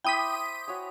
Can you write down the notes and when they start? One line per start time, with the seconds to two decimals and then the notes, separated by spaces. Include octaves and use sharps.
0.04 E4 C5 G5 D6 D#6 B6
0.68 F#4 C#5 G#5